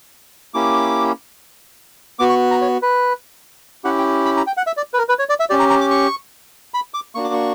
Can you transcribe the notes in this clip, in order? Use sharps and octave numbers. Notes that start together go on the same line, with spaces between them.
A#3 C#4 E4 G4 D6
B3 F#4 D6
C#6
A#5
C#5
B4
C#4 E4 G4 F#5
G5
B5
A#5
G5
F#5
E5
D5
B4
A#4
B4
C#5
D5
E5
C#4 G4 D5
A#5
A#5
D6
C#6
B5
D6
A#3 D4 F#4 C#6
D6
C#6